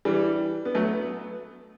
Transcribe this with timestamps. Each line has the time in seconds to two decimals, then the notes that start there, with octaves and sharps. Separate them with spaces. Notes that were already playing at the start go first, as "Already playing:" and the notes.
0.05 E3 G3
0.65 B3
0.75 F#3 A3
0.92 B3